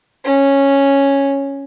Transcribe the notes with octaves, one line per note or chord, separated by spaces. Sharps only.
C#4